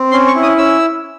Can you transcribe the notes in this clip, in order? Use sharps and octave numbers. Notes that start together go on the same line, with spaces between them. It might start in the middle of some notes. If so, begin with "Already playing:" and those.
Already playing: C4
C#4 C6
C#6
E4
D#6
C#4 E6